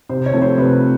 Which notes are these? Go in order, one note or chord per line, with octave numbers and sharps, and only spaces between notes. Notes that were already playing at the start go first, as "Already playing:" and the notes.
C3 C5
C#5
F3 A3 C4
C5
C3 B4